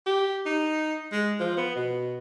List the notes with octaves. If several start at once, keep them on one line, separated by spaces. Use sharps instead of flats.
G4
D#4
G#3
F3
B3
B2